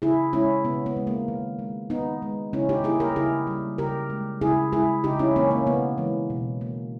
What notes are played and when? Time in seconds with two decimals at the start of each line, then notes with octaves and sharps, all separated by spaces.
0.02 C#3 E4 G#4
0.33 G#3 C#4 E4
0.65 C#3 B3
0.86 B3
0.96 G#3
1.07 A#3
1.28 D#3
1.59 G#3
1.90 D#3 B3 D#4
2.22 G#3
2.53 C#3 C#4 E4
2.69 D#4 G4
2.84 G3 A#3 E4 G#4
3.00 G4 A#4
3.16 C#3 E4 G#4
3.47 G3 A#3
3.78 C#3 G4 A#4
4.10 G#3
4.41 C#3 E4 G#4
4.72 G#3 E4 G#4
5.04 C#3 D#4 G4
5.19 C#4 E4
5.36 E3 G#3 A#3 C#4
5.51 A#3 C#4
5.67 C#3 B3
5.98 E3 G#3
6.30 B2
6.61 A#3